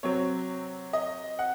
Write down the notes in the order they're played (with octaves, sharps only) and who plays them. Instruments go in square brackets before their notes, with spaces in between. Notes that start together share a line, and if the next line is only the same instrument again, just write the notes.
[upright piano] C3 F#3 C4 C#5
D#5
F#5